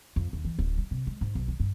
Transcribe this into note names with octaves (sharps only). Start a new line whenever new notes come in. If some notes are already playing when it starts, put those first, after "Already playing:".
F2
D#2
E3
D1
G3
C3
G#3
G#2
B1
D#3
G2